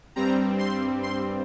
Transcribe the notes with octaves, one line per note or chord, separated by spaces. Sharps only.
G2 G3 C4 A#5
C6
C6